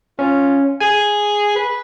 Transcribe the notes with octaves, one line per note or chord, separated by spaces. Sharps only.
C#4 F4
G#4 G#5
B4